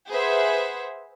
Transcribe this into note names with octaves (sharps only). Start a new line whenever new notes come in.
G#4 B4 C5 E5 F#5